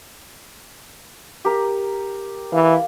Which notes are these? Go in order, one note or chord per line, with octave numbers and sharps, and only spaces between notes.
G4 A#4 A#5
E3 F5